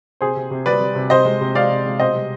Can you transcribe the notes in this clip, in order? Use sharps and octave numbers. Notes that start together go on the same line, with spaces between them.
C3 G#4 C5
C3
C3
G3 B4 D5
G3
C3
C3 C5 D#5
G#3
C3
G#3 D5 F5
C3
G#3
B2 C5 D#5
G3